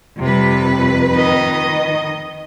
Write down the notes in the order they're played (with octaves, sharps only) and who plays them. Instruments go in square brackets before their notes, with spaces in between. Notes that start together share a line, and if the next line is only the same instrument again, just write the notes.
[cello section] F2 B4 [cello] C3 G3
[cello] D#3 D#5